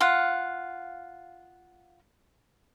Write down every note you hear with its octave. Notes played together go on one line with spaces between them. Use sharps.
F4 F5 F#5